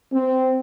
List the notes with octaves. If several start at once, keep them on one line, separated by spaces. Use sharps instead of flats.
C4